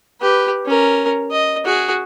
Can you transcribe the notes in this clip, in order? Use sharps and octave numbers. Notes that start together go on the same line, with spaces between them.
G4 B4
C#4 A#4
D#5
F#4 G#4